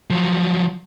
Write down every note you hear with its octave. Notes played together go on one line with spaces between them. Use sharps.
F3 F#3